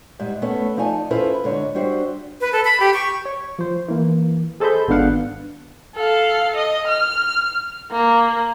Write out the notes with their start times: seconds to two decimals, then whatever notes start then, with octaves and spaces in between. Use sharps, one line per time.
0.19 G#2 G3 E5
0.42 A3 B3 C#4 A4
0.77 F3 D#4 D5 G#5 A5
1.11 C#4 E4 F4 A4 B4 C5
1.44 G#2 D3 C#5
1.75 G3 D4 F#4 C5 E5
2.41 B4
2.52 A4
2.65 B5
2.80 G4
2.94 C#6
3.25 C#5
3.59 F3 C5
3.88 E3 A#3
4.60 G#4 A4 C5 D#5 B5 G6
4.88 G#1 B3 D4 F5 F#5
5.96 A4 F5
6.56 D#5
6.88 F6
7.92 A#3